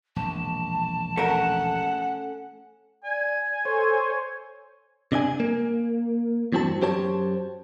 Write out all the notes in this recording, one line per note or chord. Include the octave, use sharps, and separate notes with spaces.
E1 A#1 A5
A3 C#4 A#4 F#5
D5 G#5
A4 C5 C#5
C3 D4 D#5 G#5
A#3
E2 G2 C4 F#4 A5
F#2 G4 C5 C#5 A5